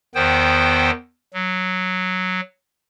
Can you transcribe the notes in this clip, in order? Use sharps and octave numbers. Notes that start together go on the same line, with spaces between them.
E2 D#3 B3 C5 G5
F#3